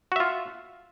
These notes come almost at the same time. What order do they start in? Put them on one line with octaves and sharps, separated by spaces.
F#4 E5 F4